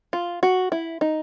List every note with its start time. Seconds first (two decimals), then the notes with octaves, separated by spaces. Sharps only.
0.13 F4
0.43 F#4
0.72 E4
1.01 D#4